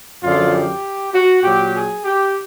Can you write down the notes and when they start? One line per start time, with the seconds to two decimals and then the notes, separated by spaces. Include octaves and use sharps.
0.22 F#2 D3 F3 F4
0.53 G4
1.13 F#4
1.43 A#2 F#3 G4
1.74 G#4
2.04 G4